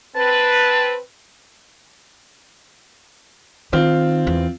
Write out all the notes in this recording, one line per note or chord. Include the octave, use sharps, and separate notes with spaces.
C4 B4 A5
D#3 C4 F4
E2